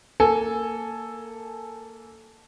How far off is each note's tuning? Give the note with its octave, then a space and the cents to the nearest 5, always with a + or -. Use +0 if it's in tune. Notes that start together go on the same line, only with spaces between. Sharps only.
A#3 -15 A4 +0 G#5 +10